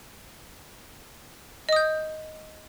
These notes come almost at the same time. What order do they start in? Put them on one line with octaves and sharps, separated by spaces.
D#5 D#6 G6